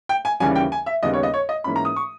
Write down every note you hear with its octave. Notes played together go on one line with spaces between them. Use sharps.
G5
G#5
D#2 C#3 E3 G3 C#4 G#5
G5
G#5
E5
D#2 C#3 G3 B3 D#5
C#5
D#5
C#5
D#5
G#2 E3 A#3 C#4 B5
A#5
D#6
C#6